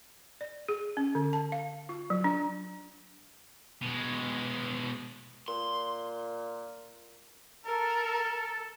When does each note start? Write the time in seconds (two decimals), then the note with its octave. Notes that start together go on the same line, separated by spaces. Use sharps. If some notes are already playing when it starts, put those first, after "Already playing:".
0.41 D5
0.69 G#4
0.97 C#4
1.15 D3
1.33 A5
1.52 F5
1.89 F4
2.10 F#3
2.24 D4
3.82 B2 G#3
5.48 A#2 C6
7.65 A4 A#4